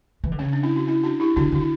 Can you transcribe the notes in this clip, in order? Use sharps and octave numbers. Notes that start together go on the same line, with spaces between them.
E3
D3
C#3 C#4
D4
C#4 E4
F#4
C#4 E4
D4 F#4
E4 G4
D3 D4 F#4
D3 F#4
E4